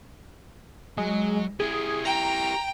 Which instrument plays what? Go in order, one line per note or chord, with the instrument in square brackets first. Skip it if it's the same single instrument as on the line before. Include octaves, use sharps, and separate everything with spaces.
[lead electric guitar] F#3 [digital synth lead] G#3
[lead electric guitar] E4 G4 [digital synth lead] G#4
[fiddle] G5 [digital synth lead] A#5